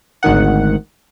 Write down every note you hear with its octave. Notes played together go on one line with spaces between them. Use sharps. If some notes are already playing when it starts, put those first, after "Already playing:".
G#1 D2 D#3 F#5